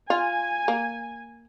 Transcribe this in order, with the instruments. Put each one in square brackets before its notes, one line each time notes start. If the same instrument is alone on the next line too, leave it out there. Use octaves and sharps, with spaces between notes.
[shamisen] F4 [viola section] G#5
[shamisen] A#3